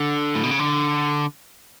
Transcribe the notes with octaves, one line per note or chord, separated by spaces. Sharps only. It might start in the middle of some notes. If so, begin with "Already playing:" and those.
Already playing: D3
A2
B2
C#3
D3